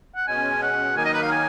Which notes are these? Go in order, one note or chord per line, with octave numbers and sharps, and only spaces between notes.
F#5
B2 G#3 C#4 G#5
F#5
D#3 F#3 A#3 D#4 A#4 G#5
D#5
B4
F5
G#5